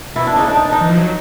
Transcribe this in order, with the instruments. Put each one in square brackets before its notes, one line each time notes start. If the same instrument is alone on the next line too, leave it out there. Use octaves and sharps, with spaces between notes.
[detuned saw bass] B2 [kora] E4
[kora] D4
[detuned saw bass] C#3 [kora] D#4
[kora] D4
D#4
D4
D#4
[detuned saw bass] E3
F3
F#3